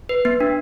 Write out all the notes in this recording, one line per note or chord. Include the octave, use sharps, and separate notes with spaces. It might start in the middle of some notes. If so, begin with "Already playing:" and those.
B4
B3
D4